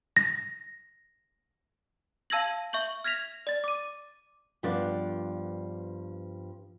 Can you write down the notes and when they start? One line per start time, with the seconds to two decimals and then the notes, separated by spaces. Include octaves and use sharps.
0.17 A#6
2.30 F5 A5 E6 G#6 A#6 F#7
2.73 E5 C#6 G6 F#7
3.04 F6 G#6 A#6 B6 F7
3.47 D5 A6
3.64 D6 D#7
4.63 G2 F3 B3 D4 D5